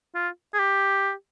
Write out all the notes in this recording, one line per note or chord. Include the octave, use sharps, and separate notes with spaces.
F4
G#4
G4